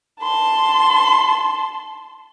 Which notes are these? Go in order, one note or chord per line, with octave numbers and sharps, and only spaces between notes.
A5 C6